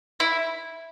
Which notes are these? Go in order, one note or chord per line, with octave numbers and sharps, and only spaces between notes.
E4